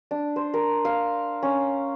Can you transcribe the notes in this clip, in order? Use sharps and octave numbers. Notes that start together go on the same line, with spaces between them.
D4
C5
A#4
F5
C#4